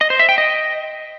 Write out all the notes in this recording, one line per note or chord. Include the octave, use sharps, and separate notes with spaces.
D#5
C5
E5
G5
D#5